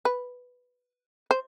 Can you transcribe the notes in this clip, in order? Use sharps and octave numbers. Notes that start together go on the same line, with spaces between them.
B4
C5